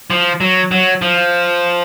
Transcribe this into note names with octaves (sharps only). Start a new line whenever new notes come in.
F3
F#3
F#3
F3